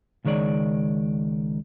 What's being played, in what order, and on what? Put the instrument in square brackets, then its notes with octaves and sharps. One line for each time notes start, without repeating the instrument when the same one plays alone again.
[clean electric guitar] C#2 D#3 G#3 C#5 D5